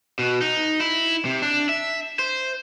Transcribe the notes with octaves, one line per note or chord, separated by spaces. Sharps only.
B2
D#4
E4
C3
D4
E5
C5